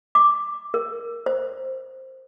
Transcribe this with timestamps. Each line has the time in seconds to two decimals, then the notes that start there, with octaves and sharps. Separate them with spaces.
0.15 D6
0.74 A#4
1.26 C5